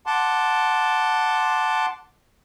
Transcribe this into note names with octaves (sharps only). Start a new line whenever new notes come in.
F#5 A5 C6 D6